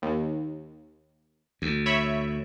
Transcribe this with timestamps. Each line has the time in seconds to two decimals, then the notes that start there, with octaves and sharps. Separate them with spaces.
0.02 D#2
1.62 D2
1.86 C#5 E5 B5